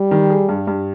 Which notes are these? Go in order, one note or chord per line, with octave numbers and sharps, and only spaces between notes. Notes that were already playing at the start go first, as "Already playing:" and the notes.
Already playing: G3
D#3
G#4
G2
G2